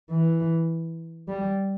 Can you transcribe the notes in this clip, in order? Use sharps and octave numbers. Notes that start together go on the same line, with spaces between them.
E3
G3